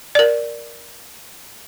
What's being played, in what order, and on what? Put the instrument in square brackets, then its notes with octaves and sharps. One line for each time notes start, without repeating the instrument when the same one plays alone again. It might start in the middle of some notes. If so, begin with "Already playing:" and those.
[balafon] A#4 D5